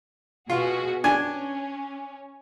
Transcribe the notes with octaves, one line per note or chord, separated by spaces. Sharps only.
B2 F4 F#4 G#4
C#4 D4 G#5